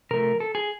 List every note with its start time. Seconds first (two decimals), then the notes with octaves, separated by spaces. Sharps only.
0.11 C3 F3 A3 A#4
0.40 A4
0.55 G#4